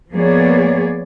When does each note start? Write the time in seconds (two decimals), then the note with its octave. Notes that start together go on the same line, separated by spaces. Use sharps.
0.13 F3 A#3 B3 G#4 C#5 D5